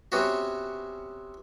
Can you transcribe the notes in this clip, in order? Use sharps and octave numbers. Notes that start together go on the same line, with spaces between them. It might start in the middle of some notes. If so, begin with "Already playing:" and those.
C3 B3 C#4 F#4